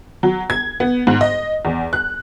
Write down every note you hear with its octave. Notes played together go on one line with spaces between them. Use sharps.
F#3
G#6
B3
G#2
D#5
E2
F#6